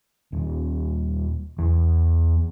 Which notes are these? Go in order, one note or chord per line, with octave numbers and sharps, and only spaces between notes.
D#1
E2